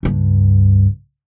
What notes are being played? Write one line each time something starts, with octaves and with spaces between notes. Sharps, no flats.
C#2 G2